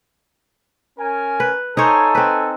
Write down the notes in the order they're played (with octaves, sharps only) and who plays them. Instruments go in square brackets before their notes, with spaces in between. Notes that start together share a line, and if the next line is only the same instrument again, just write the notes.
[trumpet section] C#4 A#4 G#5
[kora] B4
[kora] D#4 C5 C#5 [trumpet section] A4 G#5
[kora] C4 B4